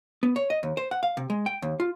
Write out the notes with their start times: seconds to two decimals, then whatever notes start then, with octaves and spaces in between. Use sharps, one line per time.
0.23 B3
0.36 C#5
0.50 D#5
0.63 D#2
0.77 C5
0.91 F#5
1.03 F5
1.17 C3
1.30 G#3
1.46 G5
1.62 D#2
1.80 F4